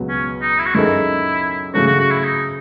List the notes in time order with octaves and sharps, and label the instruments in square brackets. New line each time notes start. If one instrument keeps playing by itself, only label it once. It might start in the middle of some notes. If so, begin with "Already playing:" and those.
Already playing: [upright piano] C#2 B2 F#3 B3
[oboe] C#4
D#4
E4
F#4
[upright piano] F#2 D#3 G#3 D#4 A4 [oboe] E4
[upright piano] C#3 F#3 A3 C#4 [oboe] F#4
[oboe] F#4
F#4
E4
D#4